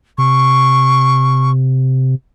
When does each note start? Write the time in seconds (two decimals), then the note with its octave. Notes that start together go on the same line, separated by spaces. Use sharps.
0.18 C3 C#6